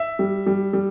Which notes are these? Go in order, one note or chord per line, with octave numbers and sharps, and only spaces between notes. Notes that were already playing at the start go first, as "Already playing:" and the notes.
Already playing: E5
G3
G3
G3